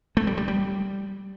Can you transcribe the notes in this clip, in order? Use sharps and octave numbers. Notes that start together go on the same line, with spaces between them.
A3
G3
G3
G3